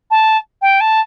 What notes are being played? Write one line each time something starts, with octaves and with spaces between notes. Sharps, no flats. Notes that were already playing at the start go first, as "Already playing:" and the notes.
A5
G5
A5